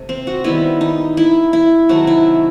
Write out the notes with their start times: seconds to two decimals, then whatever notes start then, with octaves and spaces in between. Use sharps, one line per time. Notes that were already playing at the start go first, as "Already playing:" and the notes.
Already playing: C3 A3
0.09 C4
0.27 F#4
0.44 D#3 G3 B3 E4
0.81 D#4
1.17 E4
1.53 E4
1.89 C3 D#3 F#3 A3 F#4
2.07 E4